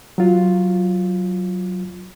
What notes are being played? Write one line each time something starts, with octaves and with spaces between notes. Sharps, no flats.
F#3 F4